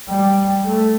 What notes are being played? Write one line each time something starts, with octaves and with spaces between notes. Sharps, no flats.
G3
A3